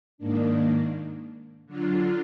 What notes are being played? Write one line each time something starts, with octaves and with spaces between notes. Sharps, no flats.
G#2 D#3 A#3 D4
D3 F#3 D4 F4